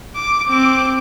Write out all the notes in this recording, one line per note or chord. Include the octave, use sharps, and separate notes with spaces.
D6
C4 D6